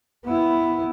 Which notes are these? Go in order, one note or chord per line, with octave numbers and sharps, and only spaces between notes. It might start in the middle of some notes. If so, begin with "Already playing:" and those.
B3 E4